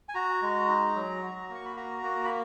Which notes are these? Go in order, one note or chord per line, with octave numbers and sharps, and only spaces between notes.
G#5
F#4 A#5
G#3
D#4
F#3
F#4
A#3 C#6
B5
F#4 A#5
A#3
B5